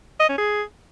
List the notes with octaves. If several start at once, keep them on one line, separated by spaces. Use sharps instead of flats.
D#5
C#4
G#4